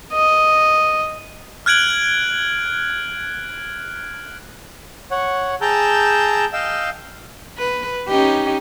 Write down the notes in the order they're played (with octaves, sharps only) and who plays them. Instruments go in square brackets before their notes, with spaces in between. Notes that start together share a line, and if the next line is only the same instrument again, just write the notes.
[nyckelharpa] D#5
[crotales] F6 F#6 G#6 D7 F#7
[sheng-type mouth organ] C#5 F#5
G#4 G5 A5 A#5 E6 G6
D#5 F5 G5 E6
[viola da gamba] B4
C#4 D#4 G4